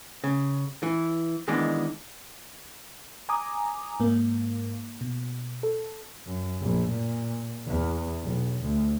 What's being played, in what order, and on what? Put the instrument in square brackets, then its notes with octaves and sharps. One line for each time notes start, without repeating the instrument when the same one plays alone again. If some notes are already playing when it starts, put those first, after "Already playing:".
[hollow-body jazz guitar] C#3
E3
D#3 E3 G#3 B3 D4
[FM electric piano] G#5 A#5 D6 D#6
G#2 A#3
B2
A4
[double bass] F#2
A#1
A#2
E2
B1
D2